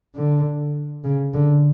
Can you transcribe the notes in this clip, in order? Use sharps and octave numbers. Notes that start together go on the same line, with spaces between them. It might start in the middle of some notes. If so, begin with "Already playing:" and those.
D3
C#3
D3